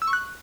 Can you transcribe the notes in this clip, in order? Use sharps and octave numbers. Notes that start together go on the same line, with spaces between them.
E6
C#6
F#6